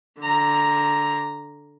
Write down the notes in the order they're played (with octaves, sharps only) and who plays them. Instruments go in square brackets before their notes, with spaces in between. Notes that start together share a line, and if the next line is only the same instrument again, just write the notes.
[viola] D3 A#5